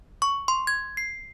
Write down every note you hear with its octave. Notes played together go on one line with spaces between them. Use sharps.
C#6
C6
G#6
C7